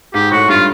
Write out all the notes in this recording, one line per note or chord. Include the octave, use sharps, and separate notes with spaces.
G#2 G4
A2 F#4
G2 F4